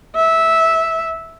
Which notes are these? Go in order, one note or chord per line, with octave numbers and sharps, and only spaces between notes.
E5